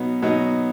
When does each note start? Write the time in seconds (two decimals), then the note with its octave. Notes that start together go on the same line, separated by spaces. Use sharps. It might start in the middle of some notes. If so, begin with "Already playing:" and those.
Already playing: B2 F#3 B3 D#4
0.22 B2 F#3 B3 D#4